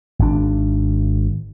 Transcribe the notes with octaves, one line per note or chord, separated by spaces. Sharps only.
G#1 D4